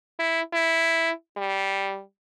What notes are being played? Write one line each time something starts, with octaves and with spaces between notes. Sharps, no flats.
E4
E4
G3